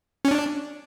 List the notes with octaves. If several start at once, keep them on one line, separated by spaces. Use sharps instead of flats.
C#4
D4